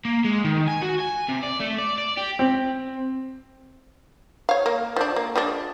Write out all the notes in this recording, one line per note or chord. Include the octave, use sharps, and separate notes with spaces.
A#3
G#3
D#3
G#5
F#4
G#5
C3
D5
A3
D5
D5
G4
C4
C#5 F5
A#3
F3 D4
A#3
F3 G#3 D4